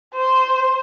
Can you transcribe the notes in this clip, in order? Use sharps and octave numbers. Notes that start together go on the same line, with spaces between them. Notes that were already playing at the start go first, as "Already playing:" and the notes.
C5